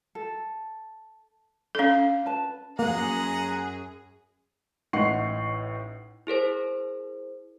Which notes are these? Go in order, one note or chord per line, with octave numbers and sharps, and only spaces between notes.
A4
C#4 D4 A4 F5
B4 A5
F#2 A#3 G#4 F#5 A#5
A1 A2 D#4 F#5 C#6 C7
E4 G#4 A#4 C5